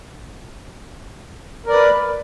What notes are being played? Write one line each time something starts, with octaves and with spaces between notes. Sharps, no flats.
A#4 B4 D5